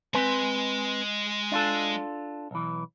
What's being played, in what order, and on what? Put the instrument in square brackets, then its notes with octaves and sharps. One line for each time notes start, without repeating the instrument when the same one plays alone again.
[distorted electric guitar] G#3 C6 [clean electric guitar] C4 B4 G#5
[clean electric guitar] D4 F4 A4
B1 E3